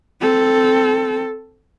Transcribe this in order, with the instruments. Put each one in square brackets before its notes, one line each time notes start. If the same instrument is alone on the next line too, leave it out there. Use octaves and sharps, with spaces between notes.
[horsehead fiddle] C4 A4